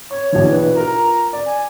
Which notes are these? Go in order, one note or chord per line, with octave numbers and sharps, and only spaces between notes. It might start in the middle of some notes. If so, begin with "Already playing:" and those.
C#5 C#6
A#1 B2 E3
B4
F4 A#4 A#5
D5
G#5